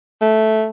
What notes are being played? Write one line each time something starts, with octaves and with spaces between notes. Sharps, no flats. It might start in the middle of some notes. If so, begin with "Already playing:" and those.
A3